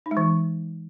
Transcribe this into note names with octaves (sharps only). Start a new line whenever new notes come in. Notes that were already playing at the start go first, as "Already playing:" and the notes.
D#4
G#3
E3